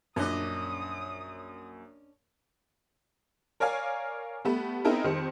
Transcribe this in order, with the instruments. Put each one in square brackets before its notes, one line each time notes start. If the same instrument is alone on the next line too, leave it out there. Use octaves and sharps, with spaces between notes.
[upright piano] A#1 F#2 [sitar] C#4 D4 D#5 [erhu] D#6
[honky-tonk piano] A#4 C#5 D5 F5 G#5
G3 A3 B3
B3 C4 D#4 E4 G#4 A#4
F2 D#3 G3 C5 C#7